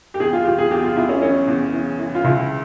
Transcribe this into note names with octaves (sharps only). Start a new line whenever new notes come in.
G4
E2 G#4
F4
E2 G4
G#4
E2 G4
F4
E2 E4
C#4
E3 C#4
E2
E3
E3
F4
C#2 E4